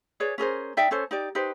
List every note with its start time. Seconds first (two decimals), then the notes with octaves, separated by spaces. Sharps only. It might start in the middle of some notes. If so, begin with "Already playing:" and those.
0.20 G#4 B4 C#5 D5
0.38 C#4 G#4 A#4 C5
0.77 D#4 D5 E5 G5
0.91 C#4 A4 C5 C#5
1.11 D#4 G4 D5
1.35 D#4 G4 B4 C5